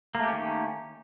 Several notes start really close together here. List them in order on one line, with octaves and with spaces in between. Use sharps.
A#3 A3 G4 C#4 D#3